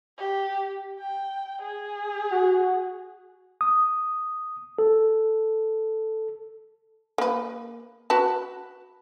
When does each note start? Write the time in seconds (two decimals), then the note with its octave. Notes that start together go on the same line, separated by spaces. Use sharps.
0.18 G4
1.00 G5
1.61 G#4
2.31 F#4
3.61 D#6
4.79 A4
7.18 A#3 B4
8.10 F#4 B4 A5